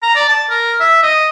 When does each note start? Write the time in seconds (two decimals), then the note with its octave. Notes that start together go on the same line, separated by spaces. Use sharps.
0.03 A#5
0.16 D5
0.28 A5
0.50 A#4
0.80 E5
1.03 D#5